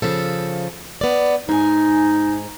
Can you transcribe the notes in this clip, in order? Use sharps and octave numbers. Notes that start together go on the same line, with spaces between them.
C#3 F3 A4
B3 D5
G#2 D#4 G#5